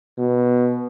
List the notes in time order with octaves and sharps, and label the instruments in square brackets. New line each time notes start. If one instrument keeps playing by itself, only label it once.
[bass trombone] B2